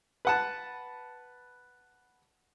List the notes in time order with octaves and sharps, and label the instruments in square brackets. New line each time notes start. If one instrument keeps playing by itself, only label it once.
[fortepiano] B4 F#5 A5